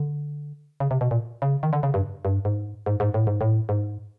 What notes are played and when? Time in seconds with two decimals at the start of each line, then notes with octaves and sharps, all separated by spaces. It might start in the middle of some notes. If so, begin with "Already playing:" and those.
Already playing: D3
0.80 C#3
0.91 C3
1.01 B2
1.11 A#2
1.42 C#3
1.63 D#3
1.73 D3
1.83 C#3
1.94 G2
2.25 G2
2.45 G#2
2.86 G#2
3.00 G#2
3.14 A2
3.27 G#2
3.41 A2
3.69 G#2